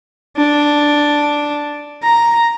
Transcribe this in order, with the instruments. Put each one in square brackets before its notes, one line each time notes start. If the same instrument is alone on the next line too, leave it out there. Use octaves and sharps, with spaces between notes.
[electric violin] D4
A#5